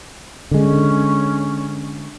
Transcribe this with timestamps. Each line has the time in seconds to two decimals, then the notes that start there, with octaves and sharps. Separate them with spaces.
0.51 D3 G#3 C#4